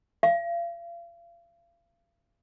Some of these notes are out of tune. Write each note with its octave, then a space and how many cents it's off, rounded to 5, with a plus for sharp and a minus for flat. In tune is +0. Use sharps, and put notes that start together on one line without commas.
F5 -35